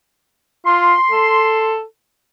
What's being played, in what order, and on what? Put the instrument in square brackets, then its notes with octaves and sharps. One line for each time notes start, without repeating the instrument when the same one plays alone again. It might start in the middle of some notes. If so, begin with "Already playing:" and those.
[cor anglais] F4 [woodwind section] C6
[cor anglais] A4